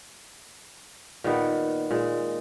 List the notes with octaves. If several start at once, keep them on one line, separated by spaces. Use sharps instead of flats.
A#2 D#3 B3
A#2 G#3